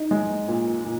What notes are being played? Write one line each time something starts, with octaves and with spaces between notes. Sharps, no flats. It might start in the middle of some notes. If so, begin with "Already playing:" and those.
Already playing: D#4
G#3
A#2
A#2